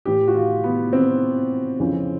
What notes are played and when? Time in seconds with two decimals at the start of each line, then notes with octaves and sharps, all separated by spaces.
0.05 A2 E3 G4
0.28 F#4
0.35 F4
0.64 B3
0.93 C4
1.80 F2 C#3 E3